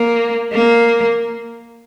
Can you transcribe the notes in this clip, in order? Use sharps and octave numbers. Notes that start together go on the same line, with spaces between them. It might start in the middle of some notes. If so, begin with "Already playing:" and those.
Already playing: A#3
A#3